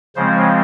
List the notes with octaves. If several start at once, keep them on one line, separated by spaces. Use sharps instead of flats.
C#3 F3 G#3 C4 C5